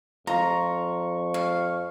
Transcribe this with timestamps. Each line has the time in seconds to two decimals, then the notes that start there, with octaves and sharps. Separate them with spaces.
0.27 F2 F4 A#5 C#6
1.34 F5